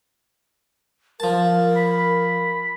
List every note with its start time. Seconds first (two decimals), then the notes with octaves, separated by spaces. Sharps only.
1.20 F3 A#4 A5
1.76 B5